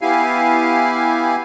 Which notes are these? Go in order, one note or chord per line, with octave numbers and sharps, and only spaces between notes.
B3 E4 G4 F5 G#5